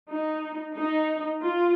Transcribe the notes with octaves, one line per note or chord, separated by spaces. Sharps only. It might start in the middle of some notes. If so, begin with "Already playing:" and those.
D#4
D#4
F4